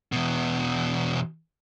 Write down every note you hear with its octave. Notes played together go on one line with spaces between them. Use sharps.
E2 B2